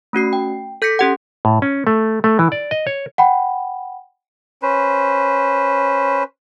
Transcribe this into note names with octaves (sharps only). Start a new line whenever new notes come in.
A3 C#4 F#4 C7
G5
A4 G6 A#6 B6 C#7
C#4 G4 F#5
A2
C#4
A3
A3
E3
D5
D#5
C#5
F#5 G5 B5
C#4 B4 C5